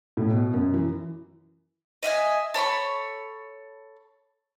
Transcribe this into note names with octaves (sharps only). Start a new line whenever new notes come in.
A2
B2
F#2
E3
D#5 E5 F#5 G#5
A4 C#5 B5 C#6